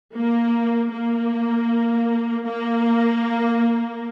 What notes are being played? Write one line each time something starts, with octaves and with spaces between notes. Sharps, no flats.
A#3
A#3
A#3